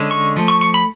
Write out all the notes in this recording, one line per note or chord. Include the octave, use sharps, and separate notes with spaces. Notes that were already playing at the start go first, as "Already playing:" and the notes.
Already playing: D3 G#3 C#4
C#6
F3 A3
C#6
C#6
B5